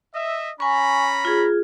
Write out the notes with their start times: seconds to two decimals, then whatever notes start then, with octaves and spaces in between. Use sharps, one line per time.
0.14 D#5 E5
0.60 C#4 G#5 A#5 B5 C#6
1.25 F4 G#4